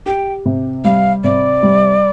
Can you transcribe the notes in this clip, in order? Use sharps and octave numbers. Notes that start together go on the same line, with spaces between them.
G4 G5
C3
G3 F5
C3 D5
G3